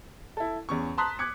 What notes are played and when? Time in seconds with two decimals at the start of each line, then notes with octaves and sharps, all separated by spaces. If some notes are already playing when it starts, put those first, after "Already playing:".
0.37 E4 A4
0.69 E2 C#4 C#6
0.98 A5 A#5 C6 D#6 F#6 B6
1.19 D6 F#6 G#6 C#7